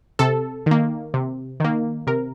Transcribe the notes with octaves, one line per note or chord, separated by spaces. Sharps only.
C3 A4
D#3 A#3
C3
D#3 A#3
C3 A#4